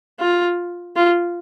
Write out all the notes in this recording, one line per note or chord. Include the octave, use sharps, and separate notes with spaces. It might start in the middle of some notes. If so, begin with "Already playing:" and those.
F4
F4